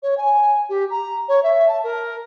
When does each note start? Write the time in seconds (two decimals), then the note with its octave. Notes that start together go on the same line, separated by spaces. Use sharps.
0.03 C#5
0.18 G#5
0.69 G4
0.90 A#5
1.29 C#5
1.43 E5
1.68 A5
1.84 A#4